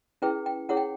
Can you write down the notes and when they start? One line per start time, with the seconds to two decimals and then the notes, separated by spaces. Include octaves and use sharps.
0.22 C#4 E4 G#4 B4 G5
0.46 G5
0.69 C#4 E4 G#4 C#5 F#5
0.77 G5